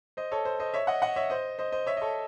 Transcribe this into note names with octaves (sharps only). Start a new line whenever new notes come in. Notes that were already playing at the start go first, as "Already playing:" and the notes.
C5 D#5
A4 C#5
C5
C5 D#5
C#5 E5
D#5 F#5
D#5 F#5
C#5 E5
C5 D#5
C5 D#5
C5 D#5
C#5 E5
D#5
A4 C#5